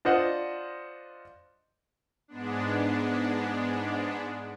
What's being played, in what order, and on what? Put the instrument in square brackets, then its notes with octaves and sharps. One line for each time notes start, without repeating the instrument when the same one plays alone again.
[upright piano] D4 F4 C5 D#5 F#5
[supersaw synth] G#2 G#3 B3 D4